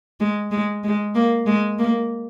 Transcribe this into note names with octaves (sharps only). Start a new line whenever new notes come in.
G#3
G#3
G#3
A#3
G#3
A#3